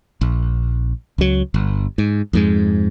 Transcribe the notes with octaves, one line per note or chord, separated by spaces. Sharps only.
A#1
C#2 F#3
G1
G#2
F2 G#2 G#3